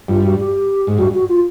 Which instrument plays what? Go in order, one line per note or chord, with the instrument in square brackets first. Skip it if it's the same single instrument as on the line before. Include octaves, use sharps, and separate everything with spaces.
[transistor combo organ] G2 [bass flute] F4
[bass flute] F#4
G4
[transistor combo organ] G#2
[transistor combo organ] G2 [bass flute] F#4
[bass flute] F#4
F4